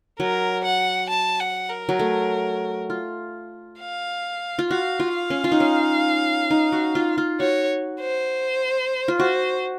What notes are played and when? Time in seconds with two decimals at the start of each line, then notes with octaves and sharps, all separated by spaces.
0.20 F#3 A#4
0.65 F#5
1.10 A5
1.40 F#5
1.70 A#4
1.89 F#3
1.99 A3
2.90 F4
3.80 F5
4.59 F4
4.70 F#4 F5
5.00 F4
5.15 F5
5.30 C#4
5.44 F4
5.52 D#4
5.60 C#4
6.51 D#4
6.72 F#4
6.95 F4
7.18 F4
7.40 F#4 C#5
8.00 C5
9.08 F4
9.20 F#4 C5